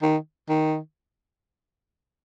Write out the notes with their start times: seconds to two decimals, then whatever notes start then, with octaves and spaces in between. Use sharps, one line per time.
0.02 D#3
0.49 D#3